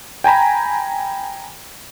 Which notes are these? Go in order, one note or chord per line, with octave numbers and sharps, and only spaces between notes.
G5 G#5 A#5 B5